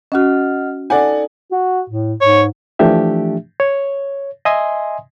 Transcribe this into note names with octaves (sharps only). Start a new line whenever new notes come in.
C#4 F#4 D#5 F#5 F6
D#4 A4 D5 F#5 G#5
F#4
A2
G#2 C#5
E3 F3 A3 D4 G4 E5
C#5
D#5 E5 G#5 C6 D#6